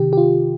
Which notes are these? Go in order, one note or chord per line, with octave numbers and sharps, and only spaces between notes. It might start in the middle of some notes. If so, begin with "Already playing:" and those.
Already playing: C3 D#3 G4
G4
F4